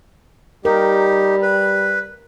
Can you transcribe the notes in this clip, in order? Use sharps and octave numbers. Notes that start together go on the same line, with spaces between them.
G3 D#4 G4 A#4
B4